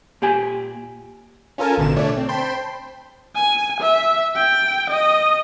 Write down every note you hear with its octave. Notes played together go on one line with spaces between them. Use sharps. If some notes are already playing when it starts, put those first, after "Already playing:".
A#2 G4 G5 G#5
C#4 F4 A4 A#4 G#5 A5
A1 B2 D3 E7
A3 D4 C#5 D5
C4
C5 G5 A5 B5 C6
G#5
E5
G5
D#5